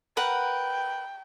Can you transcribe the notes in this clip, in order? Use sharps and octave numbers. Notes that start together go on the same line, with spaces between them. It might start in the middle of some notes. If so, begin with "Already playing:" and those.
A#4 B4 F#5 G5